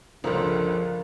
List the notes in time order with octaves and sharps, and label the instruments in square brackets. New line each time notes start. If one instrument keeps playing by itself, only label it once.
[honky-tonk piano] G1 C#2 [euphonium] D3 [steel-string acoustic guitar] F3 [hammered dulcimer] F4 A#4